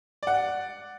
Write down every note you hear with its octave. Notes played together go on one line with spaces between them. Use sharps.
D5 F#5